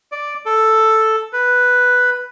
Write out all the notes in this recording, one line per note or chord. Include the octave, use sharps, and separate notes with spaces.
D5
A4
B4